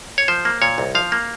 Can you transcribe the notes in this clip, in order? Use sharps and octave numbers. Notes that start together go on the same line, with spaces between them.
C#5
F3 C5
A#3
A#2 C#5
C2
F3 F5
A#3